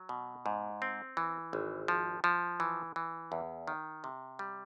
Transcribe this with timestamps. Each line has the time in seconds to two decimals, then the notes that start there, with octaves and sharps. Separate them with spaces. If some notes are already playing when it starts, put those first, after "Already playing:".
Already playing: F#3
0.09 B2
0.46 G#2
0.82 C4
1.17 E3
1.53 G#1
1.88 F3
2.24 F3
2.60 E3
2.96 E3
3.32 E2
3.67 D#3
4.04 C3
4.39 G3